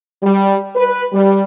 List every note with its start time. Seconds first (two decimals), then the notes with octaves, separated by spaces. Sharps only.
0.23 G3
0.76 B4
1.13 G3